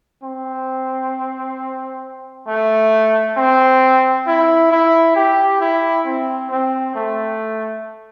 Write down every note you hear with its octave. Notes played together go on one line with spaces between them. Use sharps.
C4
A3
C4
E4
E4
G4
E4
C4
C4
A3